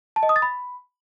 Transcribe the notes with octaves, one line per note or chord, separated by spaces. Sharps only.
A5
D#5
D#6
A6
B5